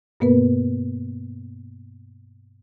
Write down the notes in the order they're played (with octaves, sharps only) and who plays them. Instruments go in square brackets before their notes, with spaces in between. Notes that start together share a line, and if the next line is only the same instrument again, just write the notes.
[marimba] G2 B2 A#3 B3 A#4 B4